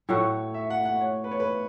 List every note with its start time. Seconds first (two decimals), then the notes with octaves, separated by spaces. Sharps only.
0.09 A2 A3 F#4 C#5
0.54 E5
0.70 F#5
0.85 F#5
1.01 C#5
1.24 B4
1.31 C#5
1.40 B4